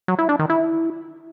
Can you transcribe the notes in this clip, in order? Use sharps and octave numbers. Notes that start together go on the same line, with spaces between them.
F#3
E4
D4
D#3
E4